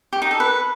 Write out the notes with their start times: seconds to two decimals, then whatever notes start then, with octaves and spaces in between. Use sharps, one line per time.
0.13 G4
0.22 D#4
0.31 A4
0.40 B4